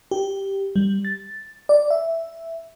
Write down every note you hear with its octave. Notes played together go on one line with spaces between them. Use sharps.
G4
G3
A6
D5
E5